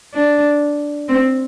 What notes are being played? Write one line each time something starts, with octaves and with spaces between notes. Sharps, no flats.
D4
C4